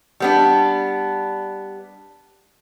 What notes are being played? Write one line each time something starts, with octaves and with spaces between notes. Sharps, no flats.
G3 B3 D4